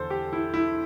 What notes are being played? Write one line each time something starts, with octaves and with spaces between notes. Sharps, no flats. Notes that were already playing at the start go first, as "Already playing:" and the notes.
Already playing: E2 D3 A4 C5
G4
E4
E4